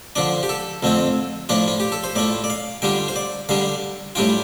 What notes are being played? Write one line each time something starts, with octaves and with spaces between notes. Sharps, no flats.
D3 F3 D4 D5
G4
A4
F2 D3 A3 C4 F4
A2 F3 D4 F4 D5
F4
G4
A4
C5
A2 A3 F4 D5
D5
F5
D3 G3 D4 F4 G5
C5
D5
D3 G3 D4 F5
A2 G3 D4 F4 G5